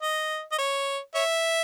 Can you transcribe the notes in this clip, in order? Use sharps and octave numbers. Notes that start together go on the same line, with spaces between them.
D#5
D#5
C#5
C#5 E5